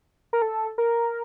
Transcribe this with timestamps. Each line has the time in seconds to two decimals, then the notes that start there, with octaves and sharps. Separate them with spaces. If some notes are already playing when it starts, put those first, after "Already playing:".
0.33 A#4
0.42 A4
0.78 A#4